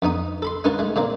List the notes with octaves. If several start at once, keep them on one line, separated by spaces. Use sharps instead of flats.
F2 B3 D#4 D#6
A4 B5 C6
C#4 D#4 A#4 B4 F5 A5
G#3 A3
A#2 G#3 A#3 C4